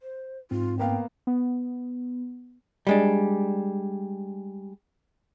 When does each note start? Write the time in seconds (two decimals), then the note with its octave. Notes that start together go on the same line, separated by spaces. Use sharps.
0.02 C5
0.51 G#2 C4 F4
0.79 A#3 B3 F5 G5
1.27 B3
2.87 G3 G#3 D4